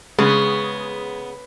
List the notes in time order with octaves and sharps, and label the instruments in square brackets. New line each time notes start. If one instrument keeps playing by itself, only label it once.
[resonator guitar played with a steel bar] C#3 [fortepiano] G#3 [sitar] B3